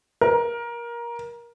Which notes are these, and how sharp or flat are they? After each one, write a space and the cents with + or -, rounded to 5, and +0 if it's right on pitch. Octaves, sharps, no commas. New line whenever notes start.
A#4 +15